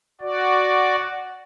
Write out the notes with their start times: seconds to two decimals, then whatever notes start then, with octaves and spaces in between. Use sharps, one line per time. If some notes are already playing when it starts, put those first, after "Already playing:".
0.21 F#4 D5